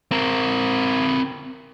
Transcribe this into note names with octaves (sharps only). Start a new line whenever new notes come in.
C4 A#4